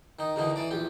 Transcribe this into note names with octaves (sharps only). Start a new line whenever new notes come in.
D#3 D#4
E2 B2 D3 D#3 D#4
E3 D5 D6
A#1 E2 G4